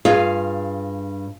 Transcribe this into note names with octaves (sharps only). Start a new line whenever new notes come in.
G2 F4 G#4 F5